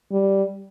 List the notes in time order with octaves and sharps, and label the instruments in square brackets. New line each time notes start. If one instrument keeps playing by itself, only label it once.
[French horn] G3